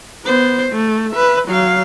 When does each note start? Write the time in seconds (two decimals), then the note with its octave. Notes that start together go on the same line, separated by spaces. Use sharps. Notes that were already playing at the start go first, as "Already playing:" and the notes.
0.25 B3 C5
0.72 A3
1.11 B4 E5
1.47 F#3 F5